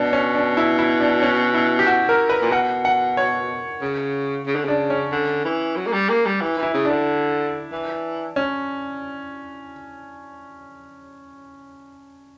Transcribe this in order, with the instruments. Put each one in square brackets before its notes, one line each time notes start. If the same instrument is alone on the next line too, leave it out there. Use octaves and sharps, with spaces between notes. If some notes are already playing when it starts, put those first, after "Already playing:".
Already playing: [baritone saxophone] B2 [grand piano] D4
[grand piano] C#4
D4
E4
E4
D4
C#4
E4
G4
F#4
A#4
B4
[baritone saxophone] A#2
[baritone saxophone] B2 [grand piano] F#5
[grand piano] F#5
C#5
[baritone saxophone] C#3
C#3
D3
[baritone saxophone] C#3 [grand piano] D4
[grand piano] C#4
[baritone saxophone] D3
E3
F#3
A#3
G3
A#3
G3
E3
[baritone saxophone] E3 [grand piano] E4
[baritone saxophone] C#3
[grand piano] D4
[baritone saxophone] D3
E3
[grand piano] C#4